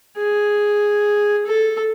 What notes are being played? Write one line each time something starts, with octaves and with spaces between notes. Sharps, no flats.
G#4
A4